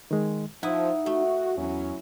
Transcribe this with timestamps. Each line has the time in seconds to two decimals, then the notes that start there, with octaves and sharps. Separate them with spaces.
0.11 D#3 G#3
0.63 F3 D#4 E4 F#5 D#6
1.06 A3 F#4
1.58 E2 F#3 C#4 E4